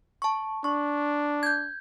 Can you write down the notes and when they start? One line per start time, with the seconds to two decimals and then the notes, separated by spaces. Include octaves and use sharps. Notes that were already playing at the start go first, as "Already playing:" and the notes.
0.22 A5 C#6
0.64 D4 C#6
1.43 G6 G#6